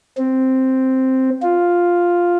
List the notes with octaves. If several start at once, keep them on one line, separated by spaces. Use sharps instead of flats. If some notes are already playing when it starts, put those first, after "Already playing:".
C4
F4